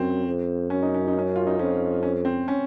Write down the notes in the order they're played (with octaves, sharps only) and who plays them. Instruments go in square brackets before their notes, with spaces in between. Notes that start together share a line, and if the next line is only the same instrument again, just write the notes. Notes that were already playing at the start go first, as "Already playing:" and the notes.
Already playing: [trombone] F#2 [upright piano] C4 C#4
[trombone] F2
[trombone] F#2 [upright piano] C#4
[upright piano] D#4
C#4
D#4
C#4
F4
D#4
[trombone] F2 [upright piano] C#4
[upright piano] C#4
C4
C#4